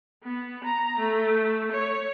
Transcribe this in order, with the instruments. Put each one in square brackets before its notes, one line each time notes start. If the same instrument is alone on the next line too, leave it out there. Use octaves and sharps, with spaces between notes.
[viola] B3
A#5
A3
C#5